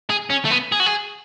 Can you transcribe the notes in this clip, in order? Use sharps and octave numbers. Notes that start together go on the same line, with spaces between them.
G#4
C#4
A3
B3
G#4
F#4
G#4